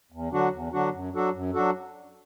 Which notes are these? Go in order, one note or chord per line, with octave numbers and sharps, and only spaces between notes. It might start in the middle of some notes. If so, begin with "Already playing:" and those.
E2
D3 F#3 D4 F#4
E2
D3 F#3 D4 F#4
F#2
F#3 D4 F#4 A4
F#2
F#3 D4 F#4 A4